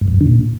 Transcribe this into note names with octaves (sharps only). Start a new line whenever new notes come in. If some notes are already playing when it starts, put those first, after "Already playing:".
G2
F2
F#2
D3
A#2